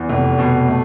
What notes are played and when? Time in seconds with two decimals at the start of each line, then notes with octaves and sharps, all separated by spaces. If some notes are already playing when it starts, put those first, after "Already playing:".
Already playing: E2
0.09 F1
0.39 B2
0.68 A3